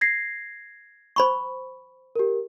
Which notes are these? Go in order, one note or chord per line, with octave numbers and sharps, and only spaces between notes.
G#6 A#6 C7
C5 B5 C#6
G4 A#4